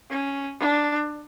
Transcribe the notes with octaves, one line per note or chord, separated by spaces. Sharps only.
C#4
D4